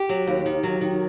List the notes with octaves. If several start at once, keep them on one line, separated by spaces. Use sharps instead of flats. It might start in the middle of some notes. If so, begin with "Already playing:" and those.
Already playing: G4
F#3
D#2
D#3
F#3
D#3